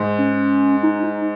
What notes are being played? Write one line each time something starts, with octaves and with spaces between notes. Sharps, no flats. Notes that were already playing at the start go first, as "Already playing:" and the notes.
Already playing: G#2
C#4
D#4
D#4